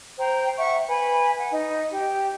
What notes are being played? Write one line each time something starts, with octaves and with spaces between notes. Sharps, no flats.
C5 G5 A#5
E5 F#5 C#6
B4 G#5 B5
F#5
D#4
G4